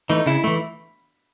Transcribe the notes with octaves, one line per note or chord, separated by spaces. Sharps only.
E3 A3 D#4
C#3 E4
E3 A3